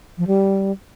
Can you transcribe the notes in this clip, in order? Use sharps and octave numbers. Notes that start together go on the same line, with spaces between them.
F3
G3